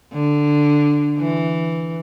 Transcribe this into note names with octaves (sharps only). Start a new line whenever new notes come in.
D3
E3